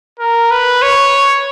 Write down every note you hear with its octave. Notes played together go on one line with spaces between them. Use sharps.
A#4
B4
C#5